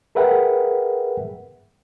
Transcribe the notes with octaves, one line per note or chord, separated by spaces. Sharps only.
G#4 A#4 B4 E5 F#5 G5